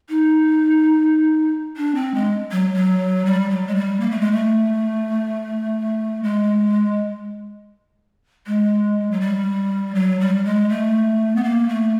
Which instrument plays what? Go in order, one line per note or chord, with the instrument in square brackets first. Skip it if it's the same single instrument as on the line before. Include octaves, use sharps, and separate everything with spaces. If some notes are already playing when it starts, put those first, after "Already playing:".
[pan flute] D#4
D4
C4
G#3
F#3
F#3
G3
F#3
G#3
G3
A#3
A3
G#3
A3
G#3
G#3
F#3
G3
F#3
G3
G#3
A3
B3
A#3
A3